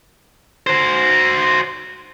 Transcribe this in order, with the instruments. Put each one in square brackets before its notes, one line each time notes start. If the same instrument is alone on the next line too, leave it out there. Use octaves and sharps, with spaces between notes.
[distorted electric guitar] F#4 C5